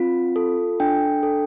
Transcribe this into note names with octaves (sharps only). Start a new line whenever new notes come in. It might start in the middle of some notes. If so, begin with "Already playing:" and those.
Already playing: C4 F4
A4
D4 G5
A4